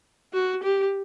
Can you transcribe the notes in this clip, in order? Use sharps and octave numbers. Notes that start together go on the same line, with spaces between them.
F#4
G4